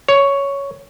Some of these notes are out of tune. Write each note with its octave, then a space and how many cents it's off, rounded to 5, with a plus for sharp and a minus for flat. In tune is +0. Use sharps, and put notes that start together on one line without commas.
C#5 +5